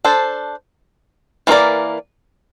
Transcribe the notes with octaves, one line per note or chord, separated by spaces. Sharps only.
D4 A4 C5
E3 A#3 F4 A#4 D5